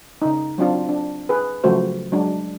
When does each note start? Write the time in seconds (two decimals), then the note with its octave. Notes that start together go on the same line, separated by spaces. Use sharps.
0.22 C#3 D#4
0.58 F#3 C4 D4 F4
0.89 D4
1.29 G#4 B4
1.64 C#3 F3 F#3 A3 F#4 C5
2.12 F#3 G#3 D4